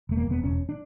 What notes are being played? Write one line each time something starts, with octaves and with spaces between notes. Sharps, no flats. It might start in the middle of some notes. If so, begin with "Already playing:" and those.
E1 A3
A#3
E1 B3
E1 C#4
D4